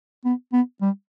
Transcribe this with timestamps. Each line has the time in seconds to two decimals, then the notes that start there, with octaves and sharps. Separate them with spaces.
0.25 B3
0.52 B3
0.81 G3